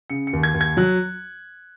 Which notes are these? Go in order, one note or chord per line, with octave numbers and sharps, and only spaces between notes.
C#3 C#7
C#7
D#2
G#6
D#2
G#6
F#3 F#6